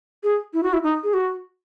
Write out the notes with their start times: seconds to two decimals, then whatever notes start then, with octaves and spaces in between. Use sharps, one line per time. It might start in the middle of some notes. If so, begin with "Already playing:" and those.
0.24 G#4
0.54 E4
0.63 F#4
0.73 E4
0.84 D#4
1.04 G#4
1.14 F#4